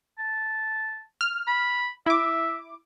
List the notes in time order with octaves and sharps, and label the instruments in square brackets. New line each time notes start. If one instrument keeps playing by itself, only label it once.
[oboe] A5
[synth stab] F6
[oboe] B5
[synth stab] E4 D6 [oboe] E5